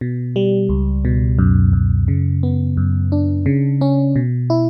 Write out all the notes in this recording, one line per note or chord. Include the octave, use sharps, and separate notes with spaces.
B2
G3
C#2
B2
F#2
F#2
C#3
B3
F#2
D4
C#3
C#4
B2
E4